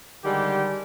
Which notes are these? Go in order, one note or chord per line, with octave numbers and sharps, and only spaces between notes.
D3 D#3 G3 G#3 G4